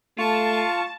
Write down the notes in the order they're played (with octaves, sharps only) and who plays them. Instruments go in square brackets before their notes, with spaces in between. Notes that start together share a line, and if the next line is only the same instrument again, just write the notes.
[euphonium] A3 [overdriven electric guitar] F4 [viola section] A5 [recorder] C#6